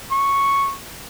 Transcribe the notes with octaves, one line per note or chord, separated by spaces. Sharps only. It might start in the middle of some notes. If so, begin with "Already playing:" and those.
C#6